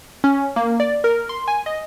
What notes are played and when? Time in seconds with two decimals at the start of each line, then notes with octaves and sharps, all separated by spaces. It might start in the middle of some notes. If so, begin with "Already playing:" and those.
0.24 C#4
0.56 A#3
0.80 D5
1.04 A#4
1.29 C6
1.48 G#5
1.66 D#5